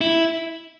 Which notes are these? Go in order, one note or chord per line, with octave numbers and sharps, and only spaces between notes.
E4